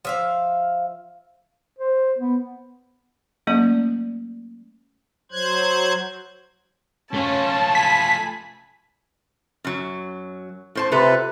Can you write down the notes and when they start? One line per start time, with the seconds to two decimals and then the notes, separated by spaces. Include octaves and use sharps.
0.05 F3 E5 F5
1.78 C5
2.18 B3
3.47 F#3 A3 A#3 C#4 D5
5.32 F#3 C5 F#6 G#6
7.14 A3 C#4 F4 A5
7.75 G#5 B5 B6
9.64 F#2 F#3
10.75 A2 C5 A5
10.92 C3 F4 A4 B4